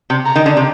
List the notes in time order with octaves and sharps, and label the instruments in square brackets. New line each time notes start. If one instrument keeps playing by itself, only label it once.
[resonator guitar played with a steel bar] C3
[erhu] A#5
[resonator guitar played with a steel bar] D#3
D3
C3